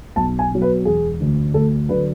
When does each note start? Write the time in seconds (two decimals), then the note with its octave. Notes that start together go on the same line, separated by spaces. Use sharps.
0.16 B1 A5
0.39 G#5
0.51 B2 F#3
0.62 B4
0.85 E1 G#4
1.20 D2 D3
1.54 D2 A4
1.89 D3 F#3 B4